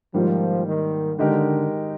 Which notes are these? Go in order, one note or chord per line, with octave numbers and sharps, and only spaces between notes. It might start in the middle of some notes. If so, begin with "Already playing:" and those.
G#2 D#3 F3 G3 A#3
D#3
D3 D#3 G#3 D#4 G4 A#4